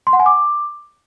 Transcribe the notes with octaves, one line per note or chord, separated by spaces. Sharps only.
C6
F#5
G#5
D6